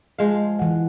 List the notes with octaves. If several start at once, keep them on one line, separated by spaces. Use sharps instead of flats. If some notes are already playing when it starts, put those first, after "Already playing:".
F3 G#3 F5
E3 F#5